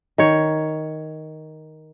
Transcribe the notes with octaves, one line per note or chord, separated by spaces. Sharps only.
D#3 C#5